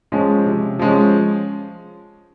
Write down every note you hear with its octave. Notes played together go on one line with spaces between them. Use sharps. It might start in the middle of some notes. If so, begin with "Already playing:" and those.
F3 G#3 C#4
C3
F3 G#3 C#4